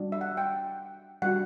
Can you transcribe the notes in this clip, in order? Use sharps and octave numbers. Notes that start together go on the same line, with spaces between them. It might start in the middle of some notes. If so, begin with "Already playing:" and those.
Already playing: G3 D4 F#4
E5
F#5
G5
G3 D4 F#4 F#5